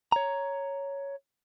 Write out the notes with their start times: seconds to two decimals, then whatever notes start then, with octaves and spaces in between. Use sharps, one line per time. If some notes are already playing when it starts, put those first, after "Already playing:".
0.12 C#5 A#5